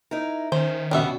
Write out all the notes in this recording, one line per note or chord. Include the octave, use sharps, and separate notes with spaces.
D#4 E4 A#4
D#3 C#4 C5
F#2 B2 G3 B3 C#4 D4 F#4 E5